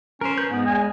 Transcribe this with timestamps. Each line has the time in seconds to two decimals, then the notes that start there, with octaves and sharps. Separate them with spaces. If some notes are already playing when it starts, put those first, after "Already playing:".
0.21 C#4 A#4 C5
0.38 B4 G6
0.50 G#2 G#3 B3
0.65 E2 G#5